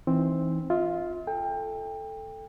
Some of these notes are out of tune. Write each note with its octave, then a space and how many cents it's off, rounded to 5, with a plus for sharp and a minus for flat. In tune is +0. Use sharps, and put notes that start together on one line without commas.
E3 +0 C4 +0 D#4 +0
F4 +0 E5 -45
A4 +0 G5 +25